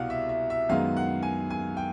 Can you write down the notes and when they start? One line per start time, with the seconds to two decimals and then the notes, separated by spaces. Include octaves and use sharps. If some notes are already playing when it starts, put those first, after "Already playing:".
Already playing: C2 B2 F5 F#5
0.10 E5
0.29 E5
0.50 E5
0.69 F#2 D#3 G#3 B3 F5
0.97 F#5
1.23 G#5
1.50 G#5
1.77 G5